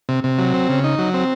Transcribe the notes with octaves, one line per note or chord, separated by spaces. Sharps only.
C3
C3
F#3
C4
C#3
D#4
F#3
C4